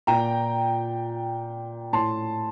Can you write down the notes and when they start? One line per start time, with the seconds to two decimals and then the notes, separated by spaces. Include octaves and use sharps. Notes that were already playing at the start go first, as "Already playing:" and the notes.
0.07 A#2 G5 A#5
1.93 A2 A5 C6